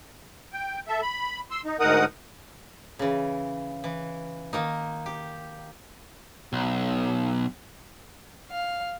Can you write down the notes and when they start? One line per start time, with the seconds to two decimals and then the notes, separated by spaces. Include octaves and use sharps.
0.53 G5
0.87 A4 E5
1.01 B5
1.51 C6 E6
1.65 D#4
1.80 D2 G#2 D#4 A#4 F#5 D#6
2.99 C#3 E3
3.84 E3
4.53 D#3 A#3 D#4
5.06 G4
6.53 B1
8.50 F5